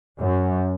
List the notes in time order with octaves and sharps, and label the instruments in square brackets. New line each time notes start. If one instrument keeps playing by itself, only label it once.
[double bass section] F#2